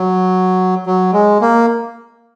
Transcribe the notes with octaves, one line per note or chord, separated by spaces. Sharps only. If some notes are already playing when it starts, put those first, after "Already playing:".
Already playing: F#3
F#3
G#3
A#3